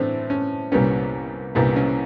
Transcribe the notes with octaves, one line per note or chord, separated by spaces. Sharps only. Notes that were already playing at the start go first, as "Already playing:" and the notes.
Already playing: A2 E3 A3 C4 D4
C#4
C2 A#2 G3 B3 C#4
C2 A#2 G3 B3
C#4